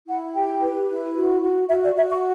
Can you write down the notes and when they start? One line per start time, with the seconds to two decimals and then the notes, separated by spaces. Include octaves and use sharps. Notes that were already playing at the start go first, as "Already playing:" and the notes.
0.08 E4 F#5
0.34 G4 G5
0.61 B4
0.88 E4
1.15 F#4
1.42 F#4
1.69 F#4 E5
1.83 D5
1.96 F#4 E5
2.10 C#6